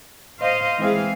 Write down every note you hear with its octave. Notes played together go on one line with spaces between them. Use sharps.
C5 D#5 F5
E3 G#3 C4 G#4 F5